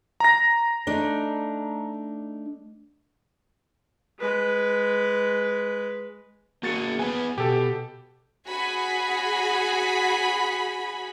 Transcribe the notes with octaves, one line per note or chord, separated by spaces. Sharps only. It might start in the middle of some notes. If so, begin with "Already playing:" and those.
A#5 A#6
A3 D4 D#4
G#3 B4
A#3 F#4 G#4 A6 C#7
B3 G#4 B4 G#5
B2 G4 A4
F#4 G#4 G#5 B5